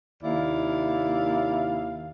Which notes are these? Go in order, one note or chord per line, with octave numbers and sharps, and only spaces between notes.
D#2 C3 E4 D5 F5